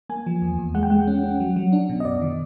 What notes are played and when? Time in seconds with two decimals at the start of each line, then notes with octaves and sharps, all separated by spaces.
0.09 A#3 G#5
0.27 F3
0.42 E2
0.58 E2
0.75 G#3 F#5
0.83 G5
0.90 G#3 F#5
1.07 C#4
1.24 C#4
1.40 F#3
1.56 F#3
1.72 D4
1.89 B2
2.00 D#5
2.05 F#2 D5
2.22 D#3